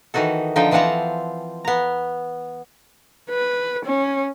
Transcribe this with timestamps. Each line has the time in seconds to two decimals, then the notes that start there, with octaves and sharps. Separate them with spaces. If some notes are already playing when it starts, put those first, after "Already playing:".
0.14 D#3 E3 D#4 F#4 A4
0.56 D3 F3 D#4 G5
0.71 E3 F3 C4 F#5 A5 A#5
1.65 B3 A#5
3.30 B4
3.85 C#4